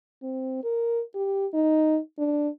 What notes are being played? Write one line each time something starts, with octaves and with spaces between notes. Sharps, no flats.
C4
A#4
G4
D#4
D4